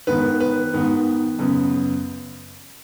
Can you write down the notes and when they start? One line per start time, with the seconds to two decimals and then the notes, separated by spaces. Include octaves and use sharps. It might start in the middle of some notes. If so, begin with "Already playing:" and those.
0.07 G#2 D#3 B3 B4
0.40 B4
0.73 G#2 D#3 B3
1.39 F#2 C#3 B3